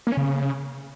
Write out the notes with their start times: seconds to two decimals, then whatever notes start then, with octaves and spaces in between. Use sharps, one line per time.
0.07 A#3
0.12 C#4
0.17 C#3